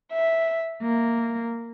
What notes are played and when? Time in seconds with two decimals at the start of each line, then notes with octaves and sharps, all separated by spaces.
0.12 E5
0.81 A#3